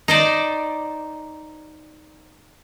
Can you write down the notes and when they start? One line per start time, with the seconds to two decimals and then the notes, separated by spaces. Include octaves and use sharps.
0.08 D#4 C5 D5